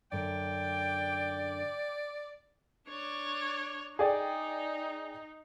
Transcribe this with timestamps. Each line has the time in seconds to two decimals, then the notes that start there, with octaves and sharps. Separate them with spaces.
0.12 F#2 D3 D5 G5
2.89 D4 C#5
3.99 D#4 G#4 D5 G5